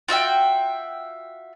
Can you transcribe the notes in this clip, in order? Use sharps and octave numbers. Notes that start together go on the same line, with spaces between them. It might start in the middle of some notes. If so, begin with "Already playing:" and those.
F4 F#4 E5 G5